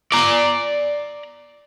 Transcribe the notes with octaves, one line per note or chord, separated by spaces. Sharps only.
D5 A#5